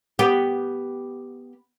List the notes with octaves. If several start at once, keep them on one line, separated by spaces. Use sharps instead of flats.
B3 G4